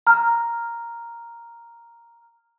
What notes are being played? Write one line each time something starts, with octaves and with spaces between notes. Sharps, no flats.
A#5 F6